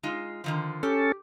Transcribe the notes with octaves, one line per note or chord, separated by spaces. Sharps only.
G#3 D#4 F4
D3 D#3 F3
C#4 G4 A4